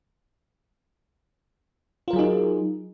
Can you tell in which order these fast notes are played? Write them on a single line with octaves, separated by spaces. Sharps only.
F4 A#4 F#3 G#4 D#4